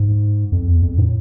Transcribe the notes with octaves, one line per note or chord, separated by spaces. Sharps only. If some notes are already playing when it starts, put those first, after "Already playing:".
Already playing: G#2
F2
E2
F2
A2